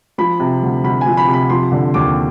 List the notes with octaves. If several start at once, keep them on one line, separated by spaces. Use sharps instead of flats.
F3 B5
C3
D2
D2 B5
G#5
F3
B5
C3
B5
F3 C6
D3
D#2 D6